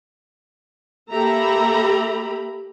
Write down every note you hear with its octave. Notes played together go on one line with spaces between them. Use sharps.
A#3 G4 A4 E5 A#5 B5